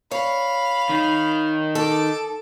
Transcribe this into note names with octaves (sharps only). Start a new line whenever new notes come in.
C#5 F5 B5
D#3 D#4
A4 A5 D6